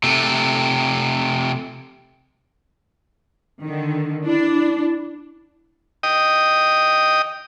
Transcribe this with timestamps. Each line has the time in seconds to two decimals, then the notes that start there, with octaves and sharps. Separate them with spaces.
0.03 C3 A3
3.62 D3 D#3
4.25 D4 E4
6.03 D#5 G5 D#6